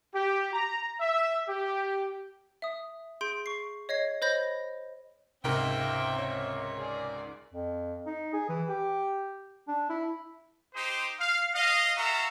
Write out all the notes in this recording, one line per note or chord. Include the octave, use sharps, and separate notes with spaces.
G4
A#5
E5
G4
E5 D#6
G#4 C6 G6 D7
C#6 C7
C#5 D#5 G#6 C7
C5 C#5 D#5 B5 G6 A#6
C#2 G#2 C3 C4 A#4 E5 G5
C#5
G#4 D5
F2
D#4
G#4
E3
G4
D4
E4
D#4 G4 C5
F5
D#5 F5
F#4 A4 E5 F5 A#5